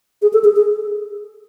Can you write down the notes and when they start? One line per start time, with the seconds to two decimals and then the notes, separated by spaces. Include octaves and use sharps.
0.22 G#4
0.33 A4
0.44 G#4
0.56 G#4